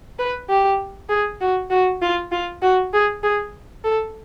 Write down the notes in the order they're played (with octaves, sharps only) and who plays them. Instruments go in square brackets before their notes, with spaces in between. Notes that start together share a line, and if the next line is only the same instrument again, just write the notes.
[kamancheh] B4
G4
G#4
F#4
F#4
F4
F4
F#4
G#4
G#4
A4